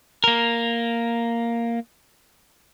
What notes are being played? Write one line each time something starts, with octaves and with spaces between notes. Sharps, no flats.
A#3 A#4